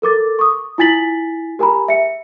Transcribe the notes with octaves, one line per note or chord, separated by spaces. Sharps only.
A4 A#4 D6 A6
C#6 D#6
E4 F4 G#5 A6 B6 F#7
G4 A#4 G#5 A#5 B5
E5 C#7